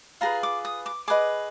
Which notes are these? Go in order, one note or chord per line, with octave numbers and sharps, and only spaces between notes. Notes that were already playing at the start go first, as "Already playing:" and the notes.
F4 G#4 B4 A#5
D6
D#6
D6
G#4 B4 D#5 D6